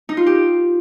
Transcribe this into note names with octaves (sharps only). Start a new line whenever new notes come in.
D#4
F4
G4